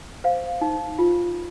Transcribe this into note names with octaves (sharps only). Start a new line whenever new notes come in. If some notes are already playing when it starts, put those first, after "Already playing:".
C5 F5
D#4
F4